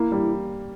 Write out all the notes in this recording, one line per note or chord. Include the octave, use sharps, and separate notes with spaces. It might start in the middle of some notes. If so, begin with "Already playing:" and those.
Already playing: A#3 E4
G3